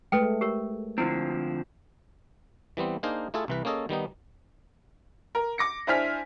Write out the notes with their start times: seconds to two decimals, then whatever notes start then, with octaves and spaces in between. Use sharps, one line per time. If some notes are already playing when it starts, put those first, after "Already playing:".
0.12 G#3 A3 A4 B4 G5
0.41 G4 A#4 C#5
0.98 D3 F3 C4 E4
2.77 E3 G3 B3 C4
3.03 A#3 D4 D#4 G#4 A#4 C5
3.34 A3 E4 F4 G#4 A4
3.48 C2 E3 B4
3.65 A#3 C#4 G#4 A4 D#5
3.89 D#3 G3 B3 D#4
5.35 A#4
5.58 D6 A#6 C#7
5.87 D4 E4 C5 G#5 F6 B6